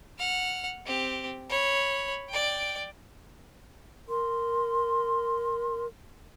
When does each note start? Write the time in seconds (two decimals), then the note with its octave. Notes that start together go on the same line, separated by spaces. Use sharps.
0.19 F#5 F6
0.86 C4 G4
1.50 C#5 B5
2.29 D5 G5
4.08 A#4 C6